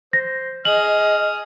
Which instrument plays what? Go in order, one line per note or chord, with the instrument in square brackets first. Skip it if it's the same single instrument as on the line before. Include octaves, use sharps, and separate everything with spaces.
[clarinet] C5 [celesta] A#6
[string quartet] G#4 [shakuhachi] D#5 [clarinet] F6 [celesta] F#7